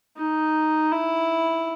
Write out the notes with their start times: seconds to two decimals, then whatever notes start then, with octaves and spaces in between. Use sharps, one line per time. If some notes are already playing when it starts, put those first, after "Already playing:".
0.17 D#4
0.92 E4